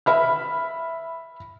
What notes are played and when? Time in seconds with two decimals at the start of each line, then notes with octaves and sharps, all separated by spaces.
0.06 E5 B5 F6